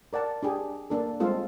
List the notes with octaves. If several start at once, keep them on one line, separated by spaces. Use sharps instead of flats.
A#4 D5 F#5 A5
D4 G4 G#4
A#3 D4 A4
G3 G#3 C4 F4 A4